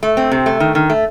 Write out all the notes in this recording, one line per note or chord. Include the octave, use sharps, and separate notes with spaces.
A3
C4
C3
A3
D#3
D#3
A3